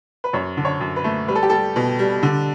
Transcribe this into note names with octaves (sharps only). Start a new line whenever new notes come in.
B4
F#2 C#5
D3
C#5
F#2
B4
A3
G3 B4
A4
G4
G3 A4
B2
G3
D3